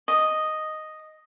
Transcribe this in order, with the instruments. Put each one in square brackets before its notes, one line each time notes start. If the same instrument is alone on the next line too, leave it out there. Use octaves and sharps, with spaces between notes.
[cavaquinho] D#5